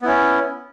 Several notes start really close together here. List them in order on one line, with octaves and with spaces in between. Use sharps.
B3 E4 C#4